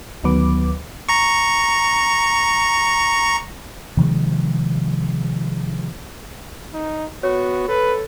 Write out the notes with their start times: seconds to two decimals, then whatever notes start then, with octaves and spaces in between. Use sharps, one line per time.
0.24 D2 D#3 F#3 B3 B4 D6
1.09 A#5 C#6
3.97 C3 D#3 F3 G#3
6.74 D#4
7.23 B3 F#4 C#5
7.68 A4 B4